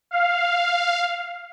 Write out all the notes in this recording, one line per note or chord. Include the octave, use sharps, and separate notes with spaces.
F5